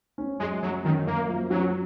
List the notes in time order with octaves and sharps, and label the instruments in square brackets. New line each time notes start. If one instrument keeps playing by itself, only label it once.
[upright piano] C#4
[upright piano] F#2 [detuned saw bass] G#3
[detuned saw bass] F#3 [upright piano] C#4
[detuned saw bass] D#3 [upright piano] C#4
[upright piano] F#2 [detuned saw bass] A#3
[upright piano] F3
[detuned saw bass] F#3 [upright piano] C#4